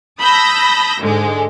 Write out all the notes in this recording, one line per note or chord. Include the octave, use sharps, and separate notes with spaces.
A5 B5 D#6 E6 G6 A#6
G#2 D3 G#3